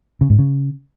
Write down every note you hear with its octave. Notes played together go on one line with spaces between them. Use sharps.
C#3
G#2
C#3